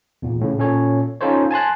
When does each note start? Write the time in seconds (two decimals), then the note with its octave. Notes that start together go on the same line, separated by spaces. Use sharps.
0.22 E2 A#2
0.41 A2 C#3
0.58 A#2 C#4 A4 C#5
1.21 C#4 D#4 F4 A4 C5 C#5
1.51 G#5 A5 C6 F#6